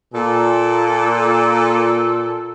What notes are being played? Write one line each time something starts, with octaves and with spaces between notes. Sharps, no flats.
A#2 A4